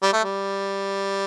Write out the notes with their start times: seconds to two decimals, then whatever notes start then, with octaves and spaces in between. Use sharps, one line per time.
0.03 G3
0.13 A3
0.24 G3